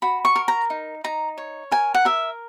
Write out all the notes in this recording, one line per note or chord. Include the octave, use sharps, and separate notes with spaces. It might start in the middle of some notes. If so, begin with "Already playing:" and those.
F#4 B5
C#6
A#4
A#5
D#4
D#4 A#5
C#5
A#4 G#5
F#5
A#4 E5